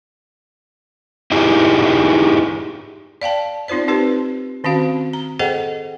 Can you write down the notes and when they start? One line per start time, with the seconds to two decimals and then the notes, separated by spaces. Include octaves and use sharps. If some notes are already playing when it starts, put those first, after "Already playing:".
1.32 D#4 E4 G4 G#4
3.21 D5 F5 G5 A5
3.68 C4 D#4 F4 C5 D5
3.88 C4 D#4 G4 B4 C5
4.64 D#3 C4 C#4 F#4 F5
5.13 A#5
5.39 G#4 A4 C5 D#5 F#5 G5